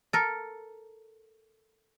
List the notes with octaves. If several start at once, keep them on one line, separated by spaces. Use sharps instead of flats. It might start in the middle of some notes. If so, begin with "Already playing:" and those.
A4 A#4